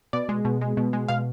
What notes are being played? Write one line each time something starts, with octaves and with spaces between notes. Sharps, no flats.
B2 D5
G#3
B2
G#3
B2
G#3
B2 F5